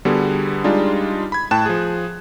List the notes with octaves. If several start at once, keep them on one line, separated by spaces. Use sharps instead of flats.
D3 G3 B3 F#4 G#4
G3 G#3 D4 D#4 F4 G#4
B5 G#6
A2 G5 A5 F#6 E7
F3 G#4